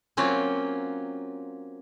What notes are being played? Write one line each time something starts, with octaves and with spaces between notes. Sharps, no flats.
F#3 A#3 C4 C#4 F4